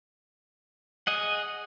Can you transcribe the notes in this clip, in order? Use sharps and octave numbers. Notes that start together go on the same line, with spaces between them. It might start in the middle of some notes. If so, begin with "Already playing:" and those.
G#4 D#5 F#5